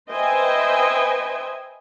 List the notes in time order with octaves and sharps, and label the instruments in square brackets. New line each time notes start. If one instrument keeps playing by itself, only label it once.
[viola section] B4 C5 D#5 E5 G5 G#5